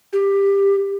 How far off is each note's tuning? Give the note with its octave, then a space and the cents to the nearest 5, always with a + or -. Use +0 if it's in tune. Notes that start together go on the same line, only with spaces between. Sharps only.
G4 +15